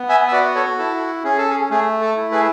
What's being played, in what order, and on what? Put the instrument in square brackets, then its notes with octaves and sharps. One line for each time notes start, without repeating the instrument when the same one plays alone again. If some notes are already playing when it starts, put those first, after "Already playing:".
Already playing: [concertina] B3
E5 G#5
E5
F#4 B4 D5
A4 C#5
E4 A4
C#4 G#4
A4
G#4
A3 G#4
A4
E4
G#4 B4